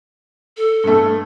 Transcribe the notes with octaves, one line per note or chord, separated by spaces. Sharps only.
A4
G2 A3